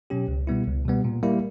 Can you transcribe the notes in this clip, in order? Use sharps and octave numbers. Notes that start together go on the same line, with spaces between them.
B2 F#3 C#4 G4
C#2
B2 G3 B3 E4
C#2
B2 G3 B3
A#2
G3 A#3 E4